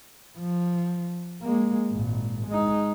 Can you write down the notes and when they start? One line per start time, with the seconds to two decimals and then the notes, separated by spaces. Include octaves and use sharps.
0.39 F3
1.42 G#3 A#3
1.91 G#1 A#2
2.47 G#3 D#4